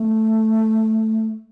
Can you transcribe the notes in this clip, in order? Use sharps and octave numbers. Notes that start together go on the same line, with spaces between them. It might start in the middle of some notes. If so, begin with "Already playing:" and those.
Already playing: A3